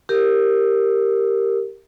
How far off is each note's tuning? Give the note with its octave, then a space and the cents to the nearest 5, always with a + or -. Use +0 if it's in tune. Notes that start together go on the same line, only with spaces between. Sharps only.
G4 +0 A#4 -10